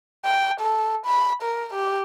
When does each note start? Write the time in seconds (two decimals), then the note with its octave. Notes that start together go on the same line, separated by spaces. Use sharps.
0.25 G5
0.60 A4
1.05 B5
1.42 A#4
1.73 G4